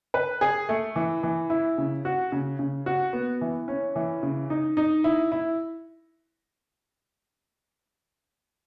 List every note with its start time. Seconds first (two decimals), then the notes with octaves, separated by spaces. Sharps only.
0.14 B4
0.41 G#4
0.69 A3
0.96 E3
1.23 E3
1.50 E4
1.78 C#3
2.05 F#4
2.32 C#3
2.59 C#3
2.86 F#4
3.13 B3
3.41 E3
3.68 C#4
3.96 E3
4.23 C#3
4.50 D#4
4.77 D#4
5.04 E4
5.32 E4